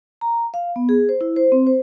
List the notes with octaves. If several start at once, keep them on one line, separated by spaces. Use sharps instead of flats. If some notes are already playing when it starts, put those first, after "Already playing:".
A#5
F5
B3
G#4
C5
E4
C5
C4
C5